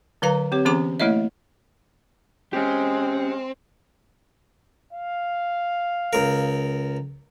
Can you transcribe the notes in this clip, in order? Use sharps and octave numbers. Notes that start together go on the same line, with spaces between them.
D3 F#3 B4 F5 A#5
C4 G4 C#5
E3 B3 C#4 G#4 A#5 D6
A3 A#3 E4 C#5 D#5 E5
G#3 C4 C#4 G4
F5
C#2 A#4